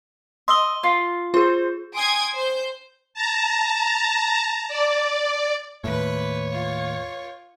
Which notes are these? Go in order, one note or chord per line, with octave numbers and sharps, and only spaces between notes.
D#5 C6 E6 G7
F4
F4 G#4 C5
G5 G#5 C6 D#6 G#6 D7
C5 G6
A5 A#5
D5
D#2 A2 B4 C#5
F4